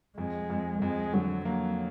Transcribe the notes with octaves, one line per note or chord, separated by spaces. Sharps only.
F2 G#3
F2
F2 G#3
D3 F#3
F#3 A#3